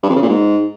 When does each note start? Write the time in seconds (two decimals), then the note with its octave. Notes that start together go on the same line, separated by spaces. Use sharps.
0.03 G2
0.09 F2
0.16 C#3
0.22 A#2
0.29 G#2